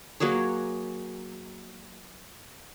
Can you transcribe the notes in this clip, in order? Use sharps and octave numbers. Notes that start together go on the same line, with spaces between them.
F#3 A#3 G#4 C#5